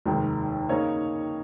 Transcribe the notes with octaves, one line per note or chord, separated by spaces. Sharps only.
F1 D#2 D#3 G#3
C#3 A#3 D#4 C#5